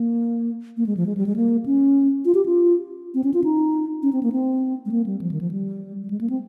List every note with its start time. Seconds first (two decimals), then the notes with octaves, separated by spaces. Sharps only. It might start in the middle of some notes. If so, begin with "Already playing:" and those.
Already playing: A#3
0.77 A#3
0.86 G#3
0.97 F3
1.06 G#3
1.17 G3
1.26 G#3
1.36 A#3
1.66 C#4
2.25 F4
2.35 G4
2.46 F4
3.14 C4
3.24 C#4
3.34 F4
3.44 D#4
4.03 C#4
4.13 C4
4.23 A#3
4.32 C4
4.86 G#3
4.91 A#3
5.06 G3
5.21 F3
5.31 D#3
5.41 F3
5.51 G3
6.02 G3
6.10 G#3
6.21 A#3
6.30 C4